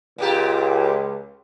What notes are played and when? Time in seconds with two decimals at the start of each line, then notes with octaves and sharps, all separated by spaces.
0.18 C#2 A#2 A#3 G4